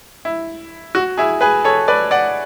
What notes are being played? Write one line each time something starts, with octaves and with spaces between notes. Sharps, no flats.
E4
F#4
E4 G#4
G#4 B4
A4 C#5
B4 D5
D5 F#5